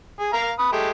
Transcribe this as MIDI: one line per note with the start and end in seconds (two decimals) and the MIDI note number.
0.20 0.33 68
0.33 0.51 70
0.33 0.51 77
0.33 0.51 82
0.59 0.69 71
0.59 0.69 87
0.72 0.90 56
0.72 0.90 57
0.72 0.90 67